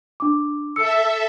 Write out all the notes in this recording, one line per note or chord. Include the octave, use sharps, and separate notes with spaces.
D4 D6
A4 E5 E6 C#7